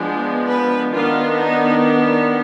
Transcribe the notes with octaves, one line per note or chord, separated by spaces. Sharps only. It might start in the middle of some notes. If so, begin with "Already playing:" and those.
Already playing: F3 G#3 B3 D4
B4
D#3 B3 D4 F4
D#4
D4